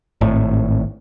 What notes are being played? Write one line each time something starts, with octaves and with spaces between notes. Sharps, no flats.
G#1 A2